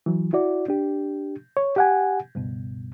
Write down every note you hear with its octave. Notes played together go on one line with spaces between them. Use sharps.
E3 F#3
E4 F#4 D5
D4 G4
C#5
G4 F#5 G#5
C#2 G2 B2